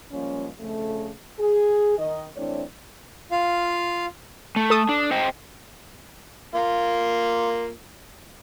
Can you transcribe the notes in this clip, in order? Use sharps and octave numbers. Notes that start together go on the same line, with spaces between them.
F3 G3 G#3 A#3 C#4
F2 C#3 A3
G#4
D#3 D#5
E3 A3 C4 D4 C#5 D5
F4 F5
A3
A4 A5 D#6
D4
C5 D#5 G5
A#3 F4